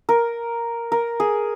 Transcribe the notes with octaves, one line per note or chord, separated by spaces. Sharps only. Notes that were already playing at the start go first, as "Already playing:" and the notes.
A#4
A#4
G#4